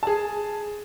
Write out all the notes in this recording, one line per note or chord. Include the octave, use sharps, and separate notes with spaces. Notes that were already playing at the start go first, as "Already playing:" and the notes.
G#4 A5